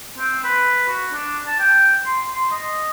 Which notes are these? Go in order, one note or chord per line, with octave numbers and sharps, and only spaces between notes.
C4
B4
F#4
D4
A5
G5
C6
C6
D#5